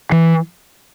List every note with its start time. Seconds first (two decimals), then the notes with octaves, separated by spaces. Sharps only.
0.12 E3